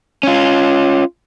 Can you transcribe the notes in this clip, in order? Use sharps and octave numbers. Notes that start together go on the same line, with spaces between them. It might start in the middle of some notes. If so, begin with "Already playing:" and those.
C#4 F4